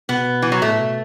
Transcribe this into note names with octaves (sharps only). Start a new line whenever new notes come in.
B2 B3
E3
F#3
A2 A3
B2